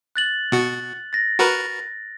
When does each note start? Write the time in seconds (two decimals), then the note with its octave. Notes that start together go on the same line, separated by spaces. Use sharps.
0.16 F#6 A6 F#7
0.52 B2 F#4
1.13 A6 A#6
1.39 F#4 A#4 B4